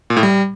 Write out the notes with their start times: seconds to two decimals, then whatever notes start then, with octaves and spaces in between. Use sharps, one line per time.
0.10 A#2
0.17 A2
0.23 G3